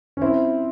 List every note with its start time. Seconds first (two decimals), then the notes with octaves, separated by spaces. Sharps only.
0.17 C#4
0.21 C4 E4